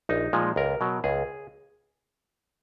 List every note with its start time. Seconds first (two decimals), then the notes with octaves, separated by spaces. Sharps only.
0.09 A#1 D#4
0.33 A#2 F3 G#3
0.56 C#2 A#4
0.81 B2 F#3
1.04 C#2 G#4